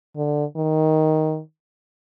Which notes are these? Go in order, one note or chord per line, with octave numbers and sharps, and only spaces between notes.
D3
D#3